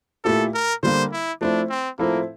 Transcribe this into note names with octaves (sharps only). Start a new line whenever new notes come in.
A#2 A3 E4 G4 A4
A#4
D3 G3 A#3 C5
E4
F3 A3 C4 D4 E4
C4
A2 F3 A#3 C4 E4 A4